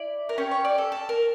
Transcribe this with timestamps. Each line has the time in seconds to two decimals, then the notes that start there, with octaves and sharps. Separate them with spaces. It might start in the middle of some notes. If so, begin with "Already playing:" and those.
Already playing: E4 D5
0.29 A#4
0.38 C#4 G4 C#5
0.51 C#5
0.65 D5
0.78 A4
0.92 A4
1.09 A#4